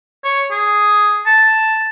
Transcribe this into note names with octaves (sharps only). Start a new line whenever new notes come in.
C#5
G#4
A5